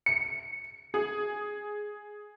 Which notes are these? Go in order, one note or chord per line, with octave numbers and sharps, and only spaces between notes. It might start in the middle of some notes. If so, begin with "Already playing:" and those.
C#7
G#4